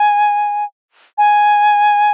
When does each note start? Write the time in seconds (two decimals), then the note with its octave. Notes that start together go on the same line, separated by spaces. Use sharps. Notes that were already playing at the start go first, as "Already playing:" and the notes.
Already playing: G#5
1.18 G#5